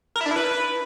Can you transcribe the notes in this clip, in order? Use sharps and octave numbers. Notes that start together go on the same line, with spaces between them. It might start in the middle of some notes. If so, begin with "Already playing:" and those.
A#4
E4
D4
E4
B4